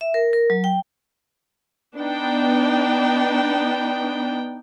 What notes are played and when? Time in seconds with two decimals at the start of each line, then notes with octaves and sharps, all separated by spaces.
0.01 E5
0.14 A#4
0.33 A#4
0.50 F#3
0.64 G5
1.98 B3 D4 D#4 G5